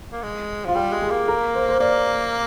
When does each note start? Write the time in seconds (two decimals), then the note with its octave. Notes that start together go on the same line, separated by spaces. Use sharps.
0.12 A#3
0.23 G#3
0.65 F3 F4
0.75 G3 G4
0.93 G#3
1.02 G#4
1.10 A#3
1.28 A#4
1.55 C5
1.69 C5
1.80 A#3 D5